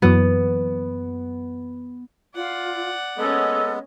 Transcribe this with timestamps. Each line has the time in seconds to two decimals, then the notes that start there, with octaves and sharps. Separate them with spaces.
0.02 F#2 E3 F#3 B3
2.35 F4 D5 F#5
3.18 G#3 A#3 B3 C#4 A4 D#5